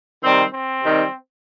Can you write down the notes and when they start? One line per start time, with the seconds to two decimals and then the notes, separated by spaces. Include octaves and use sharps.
0.23 C3 D#3 G3 C4
0.53 C4
0.83 C3 D#3 G3